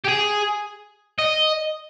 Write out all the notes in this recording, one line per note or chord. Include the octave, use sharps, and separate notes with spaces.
G4
G#4
D#5